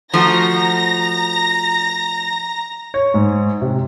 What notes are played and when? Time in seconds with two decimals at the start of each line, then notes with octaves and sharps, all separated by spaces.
0.14 F3 A3 F#4 A#5 A#6
2.94 C#5
3.14 G#2
3.62 C3